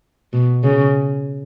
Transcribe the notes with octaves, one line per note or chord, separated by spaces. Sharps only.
B2
C#3